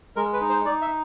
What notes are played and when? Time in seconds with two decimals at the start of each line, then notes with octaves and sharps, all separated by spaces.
0.16 G#3 A#4
0.33 B4
0.41 D#4
0.49 C5
0.65 D#4 D5
0.82 E5